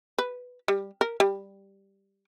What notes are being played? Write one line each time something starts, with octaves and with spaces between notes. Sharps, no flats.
B4
G3
A#4
G3